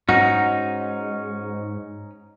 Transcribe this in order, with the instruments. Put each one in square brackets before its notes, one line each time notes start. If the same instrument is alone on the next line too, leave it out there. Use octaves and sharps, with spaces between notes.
[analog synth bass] G#2 [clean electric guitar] C#4 D#4 [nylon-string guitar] F#4